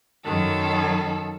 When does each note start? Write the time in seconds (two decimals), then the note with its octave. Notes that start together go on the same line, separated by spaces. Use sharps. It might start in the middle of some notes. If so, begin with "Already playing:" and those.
0.25 F#2 D#3 A4